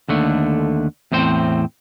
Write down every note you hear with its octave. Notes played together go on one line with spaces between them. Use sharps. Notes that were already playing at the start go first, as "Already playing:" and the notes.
D#2 D3 A3
E2 A2 C4 C5